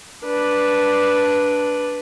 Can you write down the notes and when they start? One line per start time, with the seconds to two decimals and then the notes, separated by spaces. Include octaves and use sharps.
0.24 D4 B4